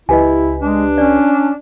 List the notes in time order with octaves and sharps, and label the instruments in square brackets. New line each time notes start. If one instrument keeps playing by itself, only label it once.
[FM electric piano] C#2 G4 B4 [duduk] E4 [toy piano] D#5 G#5
[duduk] G#3 [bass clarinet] D4
[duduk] C#4 [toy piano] D5